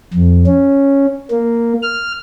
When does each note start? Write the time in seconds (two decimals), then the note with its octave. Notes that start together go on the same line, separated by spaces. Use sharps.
0.14 F2
0.47 C#4
1.31 A#3
1.83 F6